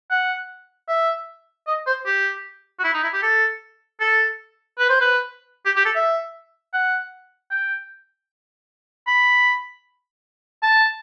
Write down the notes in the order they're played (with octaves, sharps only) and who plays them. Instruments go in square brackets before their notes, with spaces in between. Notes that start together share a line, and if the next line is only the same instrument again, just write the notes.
[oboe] F#5
E5
D#5
C5
G4
F#4
E4
D#4
E4
G4
A4
A4
B4
C5
B4
G4
G4
A4
E5
F#5
G5
B5
A5